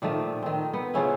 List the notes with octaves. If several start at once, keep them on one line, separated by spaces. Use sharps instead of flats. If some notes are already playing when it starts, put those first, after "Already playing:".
A#2 D#3 F3 A3
D#3 C4
B3
C#3 F3 C#4 E4